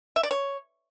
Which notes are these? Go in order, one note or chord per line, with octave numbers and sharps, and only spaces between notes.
E5
D5
C#5